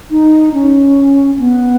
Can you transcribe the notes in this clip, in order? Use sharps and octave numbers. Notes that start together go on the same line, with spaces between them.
D#4
C#4
B3